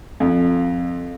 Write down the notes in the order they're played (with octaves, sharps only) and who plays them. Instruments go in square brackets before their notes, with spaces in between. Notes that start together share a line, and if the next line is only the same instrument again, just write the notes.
[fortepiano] F2